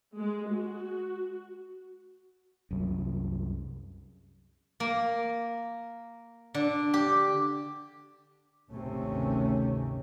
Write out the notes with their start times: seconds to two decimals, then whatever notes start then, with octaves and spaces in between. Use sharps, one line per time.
0.16 G#3
0.52 F#4
2.71 C2 F#2
4.80 A#3
6.54 D3
6.94 G4
8.71 G#1 D2 C3 D#3 A3 C#4